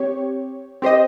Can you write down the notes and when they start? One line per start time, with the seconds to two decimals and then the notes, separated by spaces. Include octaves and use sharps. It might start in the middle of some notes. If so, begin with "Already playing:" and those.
Already playing: C4 G4 C#5
0.82 C4 G4 C5 D#5